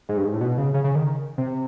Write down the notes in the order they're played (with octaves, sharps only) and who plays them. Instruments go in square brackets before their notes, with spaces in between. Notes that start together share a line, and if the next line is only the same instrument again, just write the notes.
[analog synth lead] G#2
G2
G#2
A2
B2
C#3
C#3
C#3
D#3
C3